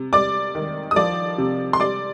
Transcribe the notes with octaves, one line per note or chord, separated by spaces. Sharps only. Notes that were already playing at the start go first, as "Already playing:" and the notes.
Already playing: C3
G3 D5 D6
D#3
D#6
F3 D5 D6
C3
C6
G3 D5 D6